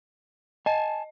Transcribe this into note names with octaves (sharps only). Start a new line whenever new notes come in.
D#5 G#5 A5